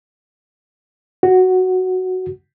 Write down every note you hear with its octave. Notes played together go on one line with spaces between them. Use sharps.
F#4